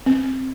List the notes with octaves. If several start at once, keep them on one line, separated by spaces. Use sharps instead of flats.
C4